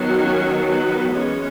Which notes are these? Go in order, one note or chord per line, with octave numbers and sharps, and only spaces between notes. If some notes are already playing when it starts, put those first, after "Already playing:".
Already playing: D#3 F#3 B3
C#4 C#5
B3 B4
E3 G#3 B3 C#4 C#5